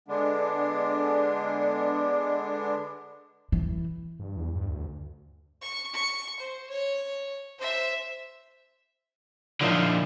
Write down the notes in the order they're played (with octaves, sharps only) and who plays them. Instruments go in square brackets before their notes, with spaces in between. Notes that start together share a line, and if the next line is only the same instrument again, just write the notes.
[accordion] D3 G#3 B3 D4
[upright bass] E3
[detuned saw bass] G2
E2
G2
D2
[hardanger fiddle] C#6
C#6
C5
C#5
C5 E5
[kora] A#2 D#4 E4 [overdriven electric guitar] D3 F3